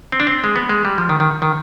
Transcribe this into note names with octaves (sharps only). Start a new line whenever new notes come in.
C4
D4
C4
G#3
B3
G#3
G3
F3
D#3
D#3
D#3